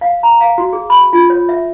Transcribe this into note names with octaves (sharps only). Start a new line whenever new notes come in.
F5
A#5
F5
F#4
G#4
B5
F4
C#5
E5